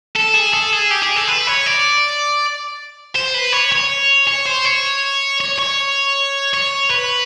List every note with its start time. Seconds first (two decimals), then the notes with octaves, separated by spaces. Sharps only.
0.16 A4
0.34 G#4
0.53 A4
0.73 G#4
0.91 G4
1.03 G#4
1.16 A4
1.28 B4
1.47 C#5
1.66 D5
3.15 C5
3.34 B4
3.53 C#5
3.72 C#5
4.28 C#5
4.46 C5
4.65 C#5
5.40 C#5
5.59 C#5
6.53 C#5
6.90 B4